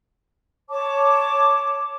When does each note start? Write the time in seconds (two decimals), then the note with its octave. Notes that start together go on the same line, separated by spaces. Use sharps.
0.69 C#5 A5 D6